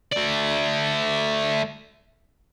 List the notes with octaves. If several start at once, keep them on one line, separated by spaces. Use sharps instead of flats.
A3 D5